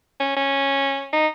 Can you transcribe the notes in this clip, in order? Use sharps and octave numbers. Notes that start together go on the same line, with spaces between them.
C#4
C#4
D#4